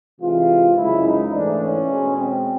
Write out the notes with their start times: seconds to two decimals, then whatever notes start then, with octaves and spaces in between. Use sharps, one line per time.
0.21 C3 E3 G#3 F4
0.77 F#2 C#3 F3 G#3 E4
1.06 D#4
1.34 G#2 E3 A3 D4
1.62 C#4
1.90 B2 G#3
2.18 C4